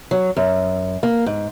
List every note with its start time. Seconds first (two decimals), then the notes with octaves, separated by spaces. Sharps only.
0.11 F#3
0.37 F#2
1.03 A#3
1.26 G#2